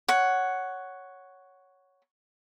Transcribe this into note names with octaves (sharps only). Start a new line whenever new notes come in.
C#5 F#5